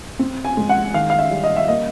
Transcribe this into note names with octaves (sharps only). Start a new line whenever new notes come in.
C4
G#5
G#3
F#5
D#3 F5
F5
E5
G3
D#5
E5
A#3 D#5